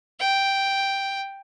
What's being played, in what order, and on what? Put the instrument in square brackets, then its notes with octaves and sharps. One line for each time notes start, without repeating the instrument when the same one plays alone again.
[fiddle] G5